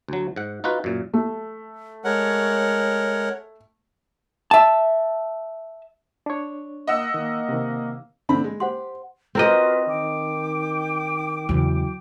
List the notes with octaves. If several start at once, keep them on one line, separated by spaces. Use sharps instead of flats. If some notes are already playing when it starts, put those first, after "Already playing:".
D2 F#3
G#2 F#5
D#4 F4 F#4 B4
F#2 A#2
A3
G#3 A#4 C#5 F#5
E5 A5
D4 C#5
A#3 D#5 F#5 E6
D#3 A#3
C3 D#3
D3 C4 B5
G#3
G4 C5 F#5 C6
C4 F4 F#4 A#4 B4 D#5
D#3 G5 D6
E2 C#3 F#3